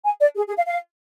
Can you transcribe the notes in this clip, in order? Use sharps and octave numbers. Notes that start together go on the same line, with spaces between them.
G#5
D5
G#4
G#4
F5
F5